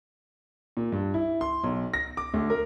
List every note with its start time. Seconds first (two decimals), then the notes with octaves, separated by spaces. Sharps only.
0.77 A#2
0.92 G2
1.14 E4
1.41 C6
1.64 B1
1.94 A#6
2.17 D6
2.34 D2
2.50 A#4